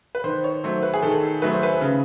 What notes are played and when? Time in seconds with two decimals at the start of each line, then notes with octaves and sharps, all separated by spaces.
0.15 B4
0.24 D#3 C5
0.44 C#5
0.64 F#3 A3 C5
0.83 B4
0.94 G#4
1.02 D#3 A4
1.42 F#3 A3 B4
1.53 C5
1.63 B4
1.81 C#3